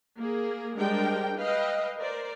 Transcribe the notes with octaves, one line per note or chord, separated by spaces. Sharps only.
A#3 G#4
G3 G#3 D4 A#4 C5 G5
B4 D#5 F5 G5
A#4 C5 D5